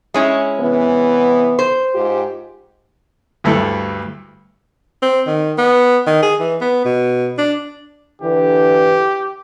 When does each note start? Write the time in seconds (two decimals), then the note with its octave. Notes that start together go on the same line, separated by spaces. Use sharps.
0.14 G#3 C#4 E4
0.59 C3 E3 B3
1.59 C5
1.95 G#2 F4 G4
3.44 D2 G2 A3 E4 A4
5.02 C4
5.27 D#3
5.58 B3
6.07 D#3
6.23 G#4
6.40 E3
6.61 B3
6.85 B2
7.38 D4
8.22 D3 E3 G4